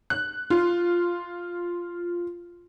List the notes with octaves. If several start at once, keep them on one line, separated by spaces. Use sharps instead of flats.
F#6
F4